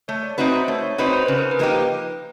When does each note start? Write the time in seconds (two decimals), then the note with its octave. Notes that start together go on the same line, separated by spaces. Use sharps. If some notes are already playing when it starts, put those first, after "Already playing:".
0.08 A3 C#5
0.23 D5
0.38 C4 D#4 F#4 B4 E5
0.54 C5
0.68 A3 C#5
0.83 C#5
0.98 C4 D#4 F#4 B4 C5
1.13 C5
1.26 C#3 B4
1.39 A#4
1.51 B4
1.59 F3 A#3 D#4 G4